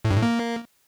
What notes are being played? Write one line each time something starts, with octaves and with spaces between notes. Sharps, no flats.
A2
G2
A2
A#3